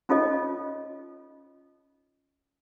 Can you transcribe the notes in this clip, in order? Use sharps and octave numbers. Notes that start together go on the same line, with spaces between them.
C#4 D#4 F4 A4 C#5 D#5